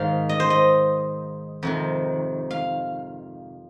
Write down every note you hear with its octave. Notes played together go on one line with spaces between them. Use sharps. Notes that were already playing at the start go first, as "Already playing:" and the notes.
Already playing: G#2 D#3 F5
D#5
C5
D#5
F2 C3 D#3
F5